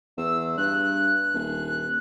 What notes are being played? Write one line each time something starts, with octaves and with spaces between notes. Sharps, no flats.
E2 E6
G2 F#6
D#1